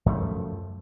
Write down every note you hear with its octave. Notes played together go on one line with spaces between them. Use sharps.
F#2 F3 A3